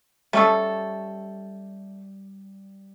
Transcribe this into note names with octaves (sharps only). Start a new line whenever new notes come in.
G3 A3 C#4 A4